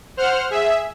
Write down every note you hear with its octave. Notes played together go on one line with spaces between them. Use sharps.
C5 F#5 F6
G#4 E5